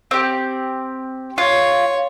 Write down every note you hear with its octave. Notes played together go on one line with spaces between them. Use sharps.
C4 G4
F4 C#5